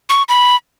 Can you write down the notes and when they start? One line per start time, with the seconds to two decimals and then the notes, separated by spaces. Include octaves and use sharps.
0.09 C#6
0.29 B5